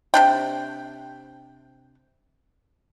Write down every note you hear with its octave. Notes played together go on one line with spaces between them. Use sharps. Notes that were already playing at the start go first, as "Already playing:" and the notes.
C3 D4 G5